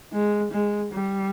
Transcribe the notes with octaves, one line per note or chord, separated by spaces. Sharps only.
G#3
G#3
G3